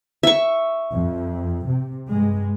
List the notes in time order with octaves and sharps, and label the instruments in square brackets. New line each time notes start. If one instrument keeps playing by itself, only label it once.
[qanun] E5 C#6
[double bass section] F2
C3
G2 G#3